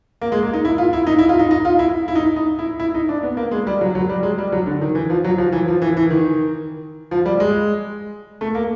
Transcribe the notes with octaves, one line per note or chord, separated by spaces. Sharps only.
A#3
G#3
A#3
D#4
E4
F4
E4
D#4
E4
F4
D#4
D#4
F4
E4
E4
D#4
D#4
E4
E4
D#4
D4
B3
A#3
G#3
G3
F#3
F#3
G3
G#3
G3
F#3
D3
D#3
E3
F3
F#3
F3
E3
F3
E3
E3
D#3
F3
G3
G#3
A3
A#3